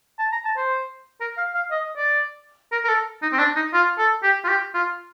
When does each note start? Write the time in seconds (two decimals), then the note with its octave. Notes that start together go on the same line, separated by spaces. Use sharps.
0.19 A5
0.32 A#5
0.45 A5
0.57 C5
1.21 A#4
1.38 F5
1.55 F5
1.71 D#5
1.97 D5
2.72 A#4
2.84 A#4
2.88 A4
3.22 D#4
3.32 C4
3.39 D4
3.56 D#4
3.73 F4
3.98 A4
4.23 G4
4.44 F4
4.48 G4
4.74 F4